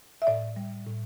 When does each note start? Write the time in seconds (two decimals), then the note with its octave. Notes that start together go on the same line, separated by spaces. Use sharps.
0.22 E5
0.27 A2 D5
0.56 G3
0.86 A2